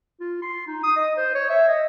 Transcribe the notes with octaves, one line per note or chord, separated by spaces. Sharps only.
F4
C6
D#4
D#6
D#5
C5
C#5
E5
D#5